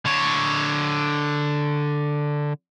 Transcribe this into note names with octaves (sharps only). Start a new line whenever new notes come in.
D3 C#5